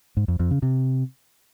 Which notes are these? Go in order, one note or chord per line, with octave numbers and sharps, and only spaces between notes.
G#2
F2
F2
C#3
C3